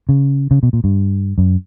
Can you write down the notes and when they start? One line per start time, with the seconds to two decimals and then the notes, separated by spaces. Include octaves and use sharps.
0.09 C#3
0.51 C#3
0.63 B2
0.73 A#2
0.84 G2
1.38 F#2